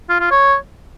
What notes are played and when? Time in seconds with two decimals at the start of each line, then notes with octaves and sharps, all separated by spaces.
0.09 F4
0.20 F4
0.31 C#5